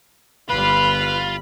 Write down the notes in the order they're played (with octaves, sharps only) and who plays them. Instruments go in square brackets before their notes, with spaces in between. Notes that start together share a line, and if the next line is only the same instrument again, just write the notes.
[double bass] G1 G3 [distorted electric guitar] F4 [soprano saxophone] B4 [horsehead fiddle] B5